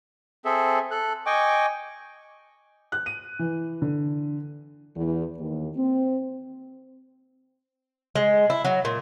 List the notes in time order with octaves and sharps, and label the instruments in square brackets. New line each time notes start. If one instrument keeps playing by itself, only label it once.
[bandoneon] C4 G#4 A4 E5
A4 F#6
D#5 G5 G#5 C#6 D6
[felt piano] F#6
D#7
E3
D3
[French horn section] E2
D#2
C4
[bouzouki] G#3
E4
F#3
A#2